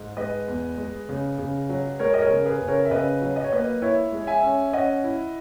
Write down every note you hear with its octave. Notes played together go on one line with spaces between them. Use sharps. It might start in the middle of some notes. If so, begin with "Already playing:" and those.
Already playing: G#2
G#3 B4 D#5
E2
G#3
C#3
C#3
F#3
G#3 A#4 C#5
D#5
A#4 C#5
C#3
G#4 B4
C#3
A#4 C#5
E5
C#3 B4 D#5
F#3
D#5
C#5
A#3 B4 D#5
E4 C#5 E5
G#3
E5 G#5
C#4
C#4 D#5 F#5
E4